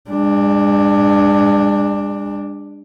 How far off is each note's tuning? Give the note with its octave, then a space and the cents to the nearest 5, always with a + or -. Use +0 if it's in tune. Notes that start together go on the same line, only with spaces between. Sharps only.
G#3 -45 D4 +10